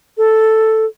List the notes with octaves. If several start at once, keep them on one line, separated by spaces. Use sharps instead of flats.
A4